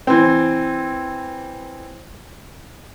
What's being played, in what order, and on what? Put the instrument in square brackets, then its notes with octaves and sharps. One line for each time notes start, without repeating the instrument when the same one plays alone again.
[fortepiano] E3 C4